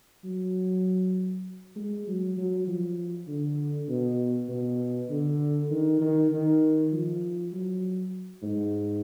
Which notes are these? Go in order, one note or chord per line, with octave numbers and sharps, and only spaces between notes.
F#3
G#3
F#3
F#3
F3
D3
B2
B2
D3
D#3
D#3
D#3
F3
F#3
G#2